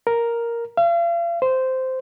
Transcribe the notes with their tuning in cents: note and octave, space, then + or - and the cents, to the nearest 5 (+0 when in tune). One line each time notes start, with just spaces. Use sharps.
A#4 +0
F5 -40
C5 -10